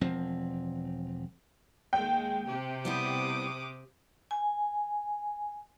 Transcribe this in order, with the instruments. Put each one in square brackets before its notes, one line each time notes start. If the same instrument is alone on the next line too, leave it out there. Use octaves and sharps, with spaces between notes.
[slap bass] E1 F3 C4
[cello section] D#2 G#3 [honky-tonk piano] G5
[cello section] C3 G4
[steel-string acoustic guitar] G3 B3 E4 [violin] D6 D#6
[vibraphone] G#5